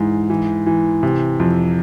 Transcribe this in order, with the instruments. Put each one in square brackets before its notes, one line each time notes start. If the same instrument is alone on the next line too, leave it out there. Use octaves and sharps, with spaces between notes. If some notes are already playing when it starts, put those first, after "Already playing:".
Already playing: [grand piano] G#2 E3
E3
E3
C3
F2